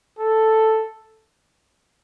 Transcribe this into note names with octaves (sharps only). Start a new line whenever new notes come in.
A4